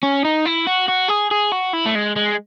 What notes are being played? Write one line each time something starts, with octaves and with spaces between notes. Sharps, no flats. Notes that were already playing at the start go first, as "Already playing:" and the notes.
C#4
D#4
E4
F#4
F#4
G#4
G#4
F#4
E4
A3
G#3
G#3